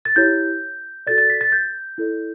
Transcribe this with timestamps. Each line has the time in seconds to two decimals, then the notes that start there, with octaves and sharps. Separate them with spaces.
0.05 A6
0.16 E4 G4 C#5 G6
1.07 F#4 A4 D5 A6
1.18 A6
1.30 B6
1.41 A6
1.52 G6
1.98 E4 A4 D5